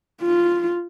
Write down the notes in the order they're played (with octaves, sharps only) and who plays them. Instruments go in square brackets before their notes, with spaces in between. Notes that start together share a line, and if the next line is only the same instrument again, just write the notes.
[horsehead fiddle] F4